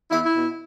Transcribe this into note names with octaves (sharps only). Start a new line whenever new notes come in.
E2 E4
E4
B2